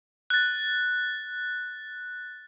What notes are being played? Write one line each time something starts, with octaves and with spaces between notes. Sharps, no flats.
F#6 A6